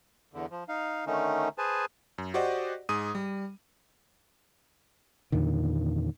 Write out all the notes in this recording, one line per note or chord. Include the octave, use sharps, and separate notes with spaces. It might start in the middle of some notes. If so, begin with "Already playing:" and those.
E2 D3
F3
D#4 F5
D3 D#3 A3 C#4 D#4
G#4 B4 C5 G#5 A5
F#2
F#4 G4 C5 D5 D#5 F#5
G#2 G#4 D#6 D#7
G3
E2 A#2 D3 D#3